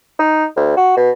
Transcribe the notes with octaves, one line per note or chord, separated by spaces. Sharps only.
D#4
D2
F#4
B2